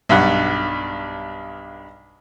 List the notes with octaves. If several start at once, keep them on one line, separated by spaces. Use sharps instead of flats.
B1 G2 F#5